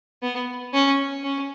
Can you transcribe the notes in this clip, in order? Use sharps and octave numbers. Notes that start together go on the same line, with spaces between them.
B3
C#4
C#4